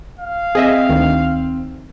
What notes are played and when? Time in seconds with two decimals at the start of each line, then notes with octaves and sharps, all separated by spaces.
0.19 F5
0.55 C4 G#4 D#5 E5
0.89 D2 D#3